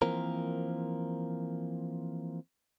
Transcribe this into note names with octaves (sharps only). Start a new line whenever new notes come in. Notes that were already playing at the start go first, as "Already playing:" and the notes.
E3 F3 A#3 C4 A#4